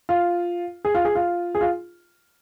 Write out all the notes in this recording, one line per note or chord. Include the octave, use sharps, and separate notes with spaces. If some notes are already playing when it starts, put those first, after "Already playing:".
F4
G#4
F4
G#4
F4
G#4
F4